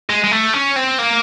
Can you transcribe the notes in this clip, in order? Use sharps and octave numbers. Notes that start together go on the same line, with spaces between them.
G#3
G#3
A3
C#4
C4
A#3